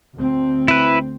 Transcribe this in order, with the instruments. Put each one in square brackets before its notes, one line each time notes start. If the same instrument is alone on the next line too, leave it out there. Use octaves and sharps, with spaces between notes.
[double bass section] D2 C4
[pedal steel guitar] E4 B4